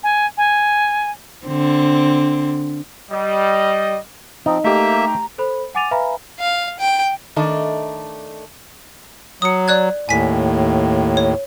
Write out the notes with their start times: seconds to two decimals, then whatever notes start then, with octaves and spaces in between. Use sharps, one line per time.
0.03 G#5
0.37 G#5
1.46 D3 C4
3.11 G3 D#5
4.46 F3 C4 D#4
4.64 A3 A#3 G4 E5 A#5
5.38 A4 C5 B5
5.75 F#5 G#5 D6 A6 D#7 F7
5.91 B4 E5 F5 G#5 A#5 B5
6.39 F5
6.79 G5
7.36 D#3 A3 D4 D5 D#5
9.42 F#3 D#6 C#7
9.68 D5 F#6 G#6
10.09 D#2 A2 G#5 B6
11.17 C#5